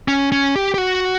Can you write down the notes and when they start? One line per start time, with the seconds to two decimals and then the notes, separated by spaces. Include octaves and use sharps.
0.08 C#4
0.32 C#4
0.56 G4
0.74 G4
0.78 F#4